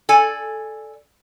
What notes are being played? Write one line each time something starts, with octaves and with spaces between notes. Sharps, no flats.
A4 D5 G#5